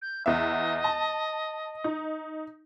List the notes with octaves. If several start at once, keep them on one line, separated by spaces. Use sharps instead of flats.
G6
E2 B3 D#5 E5
A5
D#4